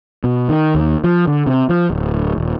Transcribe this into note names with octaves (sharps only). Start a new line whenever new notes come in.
B2
D#3
D#2
F3
D3
C3
F3
D1
D#1